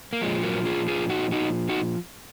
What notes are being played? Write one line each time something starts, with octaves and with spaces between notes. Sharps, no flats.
A#3
A#2 F3 G#3
F#3 A#3
F4 G#4
F4 G#4
D#4 F#4
D#4 F#4
D#4 F#4